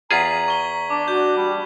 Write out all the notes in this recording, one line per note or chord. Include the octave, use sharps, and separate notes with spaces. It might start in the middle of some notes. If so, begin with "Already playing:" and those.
E2 F4 G#4 A#5 G#6 B6 F#7
C#6 G7
D4 D6
F#4 G6
G3